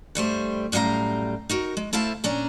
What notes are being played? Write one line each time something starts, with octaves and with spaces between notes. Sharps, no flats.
G2 G3 A3 C5
F#2 A2 G3 E4 F5 A#5
D#4 F#4 A#4
G#3
A3 E4 C5 F5 A5
A#2 C#4 D4 A#5